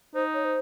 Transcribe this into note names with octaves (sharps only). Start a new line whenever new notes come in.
D#4 C5
C#5
C5